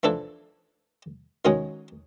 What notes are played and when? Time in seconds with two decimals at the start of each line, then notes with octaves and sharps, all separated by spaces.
0.03 E3 F3 D4 E4 A4
1.45 D#3 F#3 G#3 C#4 F#4 G#4